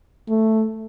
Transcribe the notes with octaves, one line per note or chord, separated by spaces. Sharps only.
A3